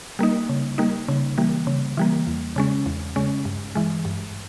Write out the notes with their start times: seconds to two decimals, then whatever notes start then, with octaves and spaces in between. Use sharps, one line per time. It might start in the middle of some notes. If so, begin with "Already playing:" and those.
0.19 G3 A#3 D#4
0.49 C#3
0.78 G3 A#3 D#4
1.08 C#3
1.38 E3 G3 A#3
1.67 C#3
1.97 E3 G3 A#3
2.27 E2
2.56 C#3 G#3 C#4
2.86 E2
3.16 C#3 G#3 C#4
3.45 G2
3.75 E3 G#3
4.05 G2